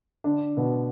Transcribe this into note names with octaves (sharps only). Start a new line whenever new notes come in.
D3 D4
B2 B3